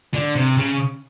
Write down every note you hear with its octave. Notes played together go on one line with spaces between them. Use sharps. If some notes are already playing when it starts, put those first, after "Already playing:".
D3
C3
C#3